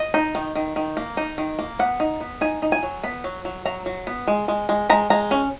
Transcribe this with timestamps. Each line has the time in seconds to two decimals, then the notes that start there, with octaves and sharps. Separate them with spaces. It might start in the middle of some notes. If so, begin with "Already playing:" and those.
Already playing: D#5
0.14 D#4
0.35 D#3
0.55 D#3
0.76 D#3
0.97 A#3
1.17 D#4
1.38 D#3
1.59 A#3
1.79 B3 F#5
2.00 D#4
2.21 B3
2.41 D#4 G#5
2.62 D#4
2.72 G#5
2.83 F#3
3.03 B3 B5
3.24 F#3
3.45 F#3
3.65 F#3 A#5
3.86 F#3
4.07 B3
4.27 G#3
4.48 G#3
4.69 G#3
4.90 G#3 A#5
5.10 G#3 A#5
5.31 C#4